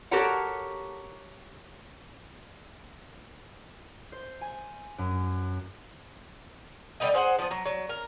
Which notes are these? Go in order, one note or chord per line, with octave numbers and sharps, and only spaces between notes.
F#4 G4 A4 A#4 C#5 F#5
C5
G#5
F#2
D3 G3 D#4 D#5
G#4 C5 F5 F#5
F3 B3
F#3
F#3
A#4